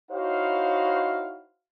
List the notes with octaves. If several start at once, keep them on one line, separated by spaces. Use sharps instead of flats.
D#4 E4 F#4 C5 C#5 F5